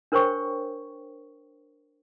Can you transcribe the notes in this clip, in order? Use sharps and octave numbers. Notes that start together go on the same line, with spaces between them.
D4 A#4 C5 C#5 G5 C#6